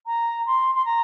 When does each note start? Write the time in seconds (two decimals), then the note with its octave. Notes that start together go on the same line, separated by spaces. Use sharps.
0.06 A#5
0.46 C6
0.74 C6
0.85 A#5